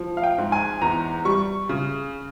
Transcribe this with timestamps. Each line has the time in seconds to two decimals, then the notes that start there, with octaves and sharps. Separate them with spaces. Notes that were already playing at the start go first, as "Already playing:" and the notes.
Already playing: F3
0.17 F5
0.23 G5
0.38 G#2
0.52 G#5
0.81 E2 A#5
1.25 G3 C#6
1.69 C#3